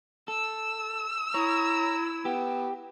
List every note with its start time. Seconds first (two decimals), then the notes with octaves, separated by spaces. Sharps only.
0.28 A4 E6
1.34 E4 C#5 A#5
2.25 B3 G4